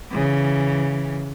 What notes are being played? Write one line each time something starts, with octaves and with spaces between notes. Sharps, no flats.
C#3 E3